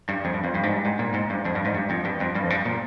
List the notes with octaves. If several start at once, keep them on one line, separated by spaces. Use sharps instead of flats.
G2
F2
G2
F2
G2
G#2
G2
G#2
A#2
G#2
G2
F2
G2
G#2
G2
F2
G2
F2
G2
F2
G2
A#2